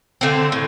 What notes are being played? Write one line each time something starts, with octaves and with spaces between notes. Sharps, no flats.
D3 A3 C4
A2